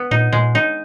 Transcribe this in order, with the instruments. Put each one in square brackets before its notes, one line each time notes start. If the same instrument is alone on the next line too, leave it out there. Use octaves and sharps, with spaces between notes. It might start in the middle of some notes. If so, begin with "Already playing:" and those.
Already playing: [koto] B3
[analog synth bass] A#2 [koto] D#4
[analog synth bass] A#2 [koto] G#3
[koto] D#4